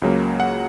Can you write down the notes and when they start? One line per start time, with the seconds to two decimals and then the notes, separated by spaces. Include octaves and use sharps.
0.02 C#2 C#3 F#3 A#3
0.40 F#5